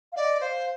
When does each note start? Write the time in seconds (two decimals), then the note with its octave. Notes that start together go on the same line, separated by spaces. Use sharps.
0.12 F5
0.16 D5 D#5
0.40 C5 F5